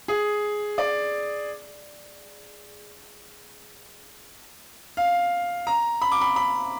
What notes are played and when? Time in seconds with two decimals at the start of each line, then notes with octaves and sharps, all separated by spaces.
0.08 G#4
0.78 D5
4.97 F5
5.67 A#5
6.02 B5
6.12 D6
6.21 B5
6.36 B5